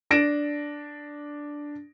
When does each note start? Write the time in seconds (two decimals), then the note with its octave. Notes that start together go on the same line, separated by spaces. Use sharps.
0.10 D4 A#6 D7 E7